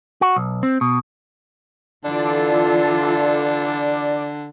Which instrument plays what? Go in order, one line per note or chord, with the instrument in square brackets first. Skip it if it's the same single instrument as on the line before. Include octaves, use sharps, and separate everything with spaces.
[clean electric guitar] F#4
B1
C4
B2
[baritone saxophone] D3 [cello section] E3 F4 A4 [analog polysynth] D5